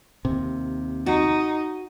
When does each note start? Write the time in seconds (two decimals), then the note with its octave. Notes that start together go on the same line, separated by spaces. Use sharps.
0.25 D#2 C3
1.06 D#4 F#4